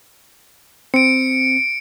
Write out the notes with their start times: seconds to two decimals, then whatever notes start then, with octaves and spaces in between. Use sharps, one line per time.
0.94 C4 C#7 D7